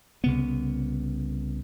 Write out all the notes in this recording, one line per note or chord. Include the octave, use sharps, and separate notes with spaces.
C2 C#3 B3